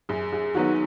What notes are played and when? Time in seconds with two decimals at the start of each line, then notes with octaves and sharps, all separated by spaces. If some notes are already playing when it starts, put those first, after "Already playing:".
0.09 F#2 G#4
0.33 G#4
0.54 D#3 F#3 B3 F#4